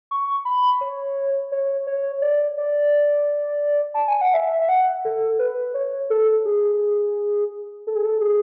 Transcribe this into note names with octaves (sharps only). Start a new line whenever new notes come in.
C#6
B5
C#5
C#5
C#5
D5
D5
A5
G#5
F#5
E5
E5
F#5
A4
B4
C#5
A4
G#4
A4
G#4
A4
G#4